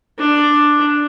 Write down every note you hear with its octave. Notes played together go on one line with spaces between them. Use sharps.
D4